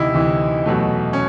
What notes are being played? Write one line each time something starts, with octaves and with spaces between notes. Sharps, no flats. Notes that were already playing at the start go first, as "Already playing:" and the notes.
Already playing: D2 C3 E3 D#4 E4
D2 C3 E3
E2 B2 F#3 A3
C#4